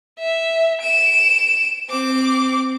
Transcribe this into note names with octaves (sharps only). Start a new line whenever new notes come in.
E5
D7 E7
C4 D6